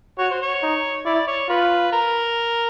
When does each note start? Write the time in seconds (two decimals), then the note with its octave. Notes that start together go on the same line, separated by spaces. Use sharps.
0.19 F#4 C#5
0.30 C5
0.42 C#5
0.63 D#4
1.05 E4 D5
1.27 C#5
1.49 F4 B4
1.92 A#4